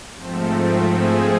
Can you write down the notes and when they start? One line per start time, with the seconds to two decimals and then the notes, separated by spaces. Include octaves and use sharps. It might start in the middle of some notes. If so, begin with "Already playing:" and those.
0.17 G#2 F3 A3 C4 C5
0.82 G#4